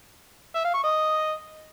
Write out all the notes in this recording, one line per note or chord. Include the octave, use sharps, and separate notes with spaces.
E5
F5
C#6
D#5